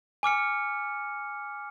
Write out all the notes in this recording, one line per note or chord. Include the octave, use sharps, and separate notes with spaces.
G#5 D6 F6 C#7